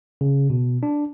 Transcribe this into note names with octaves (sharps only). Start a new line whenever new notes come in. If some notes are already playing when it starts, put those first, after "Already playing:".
C#3
B2
D4